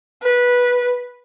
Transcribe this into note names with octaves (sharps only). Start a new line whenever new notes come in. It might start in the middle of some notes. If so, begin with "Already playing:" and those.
B4